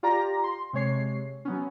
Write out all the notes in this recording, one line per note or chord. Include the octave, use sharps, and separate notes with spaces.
F4 G4 D5 A#5 A#6
C6
C3 G#3 C#5 C7
F#3 B3 C#4